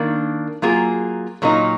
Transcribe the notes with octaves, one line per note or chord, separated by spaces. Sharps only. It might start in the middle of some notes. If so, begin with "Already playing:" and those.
Already playing: D#3 A#3 D4
F#3 A#3 F4 G#4
A#2 F#3 A#3 D#4